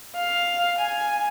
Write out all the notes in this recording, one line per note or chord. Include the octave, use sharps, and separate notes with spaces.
F5
G#5